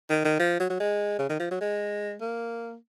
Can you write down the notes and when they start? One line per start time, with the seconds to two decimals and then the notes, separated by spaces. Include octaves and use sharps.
0.09 D#3
0.25 D#3
0.40 F3
0.60 F#3
0.70 F#3
0.80 G#3
1.19 C#3
1.29 D#3
1.39 F3
1.51 F#3
1.61 G#3
2.21 A#3